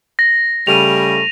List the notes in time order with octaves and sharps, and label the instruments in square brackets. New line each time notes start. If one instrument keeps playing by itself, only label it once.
[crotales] A#6
[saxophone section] C#3 G3 A3 [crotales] D#7 F7